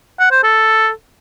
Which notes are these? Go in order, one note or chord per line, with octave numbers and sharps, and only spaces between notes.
F#5
C5
A4